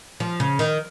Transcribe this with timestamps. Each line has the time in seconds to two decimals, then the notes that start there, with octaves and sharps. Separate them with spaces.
0.20 F3
0.40 C#3
0.59 D#3